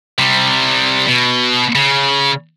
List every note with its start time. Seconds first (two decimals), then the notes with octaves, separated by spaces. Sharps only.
0.18 C3 G3
1.08 B2
1.75 C#3